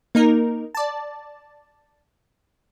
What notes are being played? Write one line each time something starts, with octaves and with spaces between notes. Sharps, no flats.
A#3 D#4 A#4
D5 A5